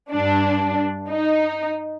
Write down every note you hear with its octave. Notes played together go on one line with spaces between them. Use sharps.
G2 D4
D#4